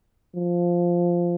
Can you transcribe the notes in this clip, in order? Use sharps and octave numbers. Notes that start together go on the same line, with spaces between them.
F3